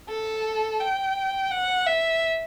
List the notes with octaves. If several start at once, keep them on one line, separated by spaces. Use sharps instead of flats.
A4
G5
F#5
E5